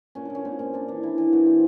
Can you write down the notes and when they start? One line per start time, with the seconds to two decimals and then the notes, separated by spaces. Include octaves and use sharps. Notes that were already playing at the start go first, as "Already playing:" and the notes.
0.15 A#2 C#4
0.25 A#2 D4
0.35 C#4
0.45 A#2 C4
0.59 A#2 C#4
0.73 C4 D4
0.88 E3 D4
1.03 E3 E4
1.18 E3
1.32 A#2 F#4
1.47 C4